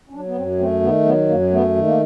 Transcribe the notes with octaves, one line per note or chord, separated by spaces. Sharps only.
C#4
F#3 D4
B3
F#2 C4
A3 C4
D#3 B3
F#3 B3
F#2 A#3
A3 B3
D#3
A#3